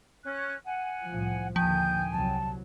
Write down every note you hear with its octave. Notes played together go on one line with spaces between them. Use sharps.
C#4 F#6
F#5 G#5
C2 A2 F3
A#1 D#2 D3 F3 G5 G#5 G6
C2 F#3 A5